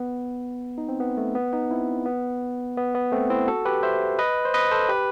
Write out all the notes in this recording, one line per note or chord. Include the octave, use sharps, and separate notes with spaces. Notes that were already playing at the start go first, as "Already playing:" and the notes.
Already playing: B3
D#4
C4
B3
A3
B3
B3 D#4
C4 E4
B3
B3
B3
A3 C4
C4 E4
F#4 A4
G4 B4
C5 E5
B4 D#5
C5
B4 D#5
A4 C5
G4 B4